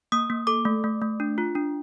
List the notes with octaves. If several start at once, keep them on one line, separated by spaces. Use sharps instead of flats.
A#3 D#6
A#3
A4 D6
A3
A3
A3
D4
F4
D4